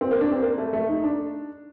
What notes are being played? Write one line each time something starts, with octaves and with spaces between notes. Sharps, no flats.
C4
A#3
D4
C4
A#3
A3
A3
D#4
D4